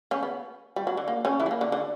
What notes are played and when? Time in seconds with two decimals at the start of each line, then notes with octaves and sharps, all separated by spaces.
0.11 C#3 C#4
0.23 B3
0.76 G3
0.87 F#3
0.97 D3
1.08 A#3
1.25 C#3 C#4
1.40 E3 E4
1.46 G3
1.51 A#3
1.61 D3
1.72 D3